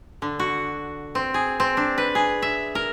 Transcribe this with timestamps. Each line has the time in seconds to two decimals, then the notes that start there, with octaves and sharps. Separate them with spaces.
0.22 D3
0.39 F#4
1.15 C4
1.34 G#4
1.60 C4
1.77 D4
1.98 B4
2.15 G#4
2.42 E5
2.75 A#4